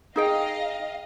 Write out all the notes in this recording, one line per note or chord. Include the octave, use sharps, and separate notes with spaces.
D#4 G#4 D#5 F5 G5